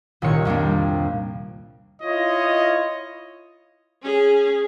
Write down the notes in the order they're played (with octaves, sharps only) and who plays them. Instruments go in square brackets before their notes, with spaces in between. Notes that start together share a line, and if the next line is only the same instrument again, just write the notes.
[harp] C2 A#2 D#3 C#5 C#7
F2 G3 A#3 D4
[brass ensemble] E4 F4 C#5 D#5
[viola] C#4 G#4